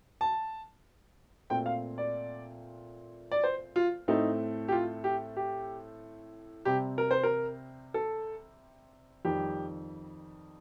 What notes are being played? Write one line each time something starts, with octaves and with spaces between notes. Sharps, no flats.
A5
A#2 A3 C4 G5
F5
D5
D5
C5
F4
A2 A3 C4 D#4
G4
F4
G4
G4
C3 G3 C4 G4
A#4
C5
A#4
A4
F2 D#3 G3 G4